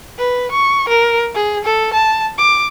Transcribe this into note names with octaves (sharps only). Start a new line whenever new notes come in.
B4
C#6
A#4
G#4
A4
A5
D6